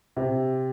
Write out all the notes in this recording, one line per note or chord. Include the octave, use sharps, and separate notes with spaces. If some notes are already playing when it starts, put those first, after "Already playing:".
C3